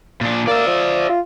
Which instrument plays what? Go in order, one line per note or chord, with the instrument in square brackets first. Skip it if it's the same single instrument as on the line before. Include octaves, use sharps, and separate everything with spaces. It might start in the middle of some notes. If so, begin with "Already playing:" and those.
[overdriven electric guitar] A#2 D4
[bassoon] A#3 [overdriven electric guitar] D5 E5
[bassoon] F3
F4